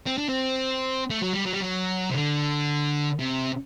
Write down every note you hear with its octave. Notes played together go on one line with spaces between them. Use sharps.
C4
D4
C4
A3
F#3
G3
F#3
G3
F#3
C3
D3
C3